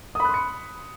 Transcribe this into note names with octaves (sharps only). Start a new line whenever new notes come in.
B5 C6 D#6 F#6 C#7